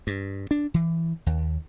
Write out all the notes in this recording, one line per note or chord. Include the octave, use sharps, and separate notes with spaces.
G2
D4
E3
D#2